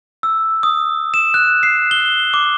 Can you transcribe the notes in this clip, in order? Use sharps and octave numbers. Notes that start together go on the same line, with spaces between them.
E6
D#6
E7
F#6
C7
G7
D6